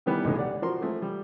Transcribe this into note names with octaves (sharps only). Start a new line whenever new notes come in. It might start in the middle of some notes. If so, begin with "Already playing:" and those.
D#3 E3 G3 B3
B1 A2 D3 G#3
G4 D5 F#5
F3 F#4 A#4 C6
F3 G#3 A3
G3